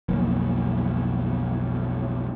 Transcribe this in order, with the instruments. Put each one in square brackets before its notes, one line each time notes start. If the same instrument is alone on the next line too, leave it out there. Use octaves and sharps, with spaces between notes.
[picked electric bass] B1 F2 D#3 A#3